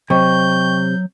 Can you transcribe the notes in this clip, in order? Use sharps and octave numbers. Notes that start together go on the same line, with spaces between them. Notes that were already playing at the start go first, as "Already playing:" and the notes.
C3 F#3 D#5 G5 C#6 G6